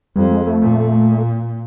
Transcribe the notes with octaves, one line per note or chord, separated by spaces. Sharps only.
F2 G3
G#3
A3
A#2